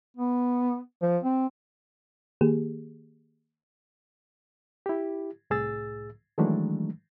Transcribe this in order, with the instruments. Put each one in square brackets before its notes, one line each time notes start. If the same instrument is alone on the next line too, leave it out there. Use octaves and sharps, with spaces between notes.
[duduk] B3
F3
C4
[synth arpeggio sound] D#3 A#3 G4 G#4
[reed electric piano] E4 G4
C2 A2 G#4 E6 A6
D#3 E3 F#3 G#3 A3 D4